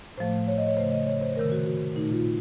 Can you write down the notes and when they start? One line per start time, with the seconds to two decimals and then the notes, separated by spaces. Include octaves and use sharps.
0.18 A2 F3 A3 C5
0.47 C#5
0.58 D#5
0.67 C#5
0.77 C#3 A3 C5
0.92 D#5
1.07 C#5
1.21 C5
1.36 C3 D#3 A3 A#4
1.52 F#4
1.66 F#4
1.96 A#2 A3 D#4
2.11 F4